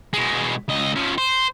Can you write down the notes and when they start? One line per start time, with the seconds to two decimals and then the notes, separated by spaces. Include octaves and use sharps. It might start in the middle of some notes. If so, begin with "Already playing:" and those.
0.14 B2 G#3
0.68 C#2 D#5
0.96 F3 C#4
1.18 C5